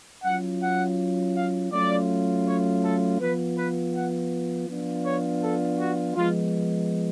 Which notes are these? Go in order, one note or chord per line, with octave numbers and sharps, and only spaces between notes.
F#3 C#4 F4 F#5
F#5
F5
F#3 A3 C#4 F4 D5
C#5
A4
F3 B3 F4 B4
B4
F#5
F3 B3 D4 F4
C#5
A4
F#4
F3 G#3 B3 F4